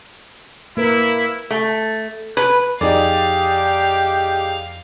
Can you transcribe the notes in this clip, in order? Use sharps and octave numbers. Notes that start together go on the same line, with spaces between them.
A#3 E4 A#4 B4
A3
B4
F2 D#4 G4 G#4 D5 F5